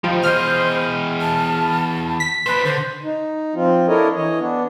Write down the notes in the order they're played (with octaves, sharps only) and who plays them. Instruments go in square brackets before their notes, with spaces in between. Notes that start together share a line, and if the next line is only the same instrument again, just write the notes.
[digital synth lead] F3 [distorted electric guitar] G3 D#4
[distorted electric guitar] E2 D#5 [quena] C5 [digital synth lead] F6
[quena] A5
[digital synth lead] B6
[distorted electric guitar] D4 C5 [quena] B4
[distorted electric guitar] D3 [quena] C5
[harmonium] D#4
F3 C4 F4
D4 E4 A4 A#4 C#5 D#5
E3 C#5 D#5
B3 D4